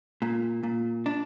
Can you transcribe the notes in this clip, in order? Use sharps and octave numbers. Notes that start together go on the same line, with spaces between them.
A#2
A#2
D4